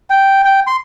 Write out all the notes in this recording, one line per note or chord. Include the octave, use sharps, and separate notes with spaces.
G5
G5
C6